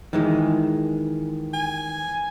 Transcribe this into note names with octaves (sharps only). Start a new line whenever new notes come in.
D#3 E3 G#3
G#5